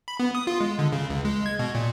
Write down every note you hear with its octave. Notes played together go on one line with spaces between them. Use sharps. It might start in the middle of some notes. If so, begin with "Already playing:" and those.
B5
B3
D#6
F4
G#3
D3
C#3
C#2
G#3
G#6
B2
A#2